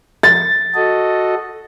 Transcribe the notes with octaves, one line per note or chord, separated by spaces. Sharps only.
A6
F#4 A4 D#5